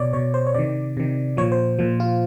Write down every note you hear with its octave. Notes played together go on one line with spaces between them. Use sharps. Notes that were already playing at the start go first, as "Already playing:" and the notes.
Already playing: B2 C#5 D5
B2 C#5
C5
C#5
C3 D#3 D5
C3 D#3
A#2 F3 C#5
C5
A#2 F3
F4